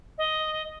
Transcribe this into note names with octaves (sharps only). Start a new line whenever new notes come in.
D#5